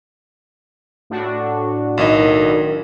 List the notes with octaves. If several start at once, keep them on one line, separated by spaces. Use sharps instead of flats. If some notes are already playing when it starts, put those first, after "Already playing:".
A2 D4 F#4
B1 D#3 E4 D#5